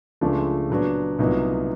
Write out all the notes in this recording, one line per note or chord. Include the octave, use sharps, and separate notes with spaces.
C#2 C#3 F3 A3 D4
A#2 F#3 B3 D4
C2 A#2 F#3 B3 D#4